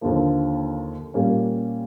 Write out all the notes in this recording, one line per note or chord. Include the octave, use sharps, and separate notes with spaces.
D#2 D3 F3 A#3
A#2 G3 A#3 C#4